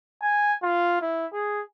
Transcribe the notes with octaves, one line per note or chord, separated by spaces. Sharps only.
G#5
F4
E4
G#4